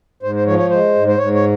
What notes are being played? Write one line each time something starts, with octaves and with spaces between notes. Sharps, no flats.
G#2 C5
C5
F3 C#5
C#5
G#3 C5
G#2
C5
G#2 C#5
C#5